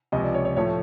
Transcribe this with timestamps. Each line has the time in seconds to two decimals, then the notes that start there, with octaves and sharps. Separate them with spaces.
0.12 C#2 C3 F3 D#5
0.23 D5
0.34 C#5
0.45 C#5
0.57 A2 F3 A3 C#5